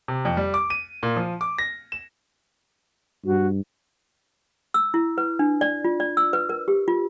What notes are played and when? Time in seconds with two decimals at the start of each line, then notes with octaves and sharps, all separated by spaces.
0.08 C3
0.25 F2
0.37 G3
0.54 D6
0.70 D#7
1.03 A#2
1.16 F3
1.41 D6
1.58 A#6
1.92 E7
3.26 G2 F#4
4.74 E6
4.94 E4
5.18 B4
5.39 D4
5.61 D5
5.85 F4
6.00 D5
6.17 E6
6.33 B4
6.49 A#4
6.68 G4
6.88 F4